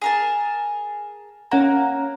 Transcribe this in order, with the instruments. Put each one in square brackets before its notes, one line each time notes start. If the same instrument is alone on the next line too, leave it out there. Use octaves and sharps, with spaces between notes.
[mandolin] G#4 A#4 A5
[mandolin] A#3 [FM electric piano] C#4 F#5 A#5